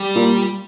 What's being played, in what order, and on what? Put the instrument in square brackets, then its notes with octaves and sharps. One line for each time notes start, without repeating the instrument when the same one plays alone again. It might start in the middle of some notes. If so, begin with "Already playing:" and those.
Already playing: [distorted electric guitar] G3
[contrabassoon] A#2